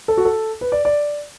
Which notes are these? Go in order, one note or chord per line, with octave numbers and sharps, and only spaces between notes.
A4
F#4
A4
B4
D5
D5